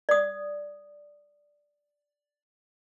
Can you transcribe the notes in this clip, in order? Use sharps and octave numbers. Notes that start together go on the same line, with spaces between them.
D5 D#6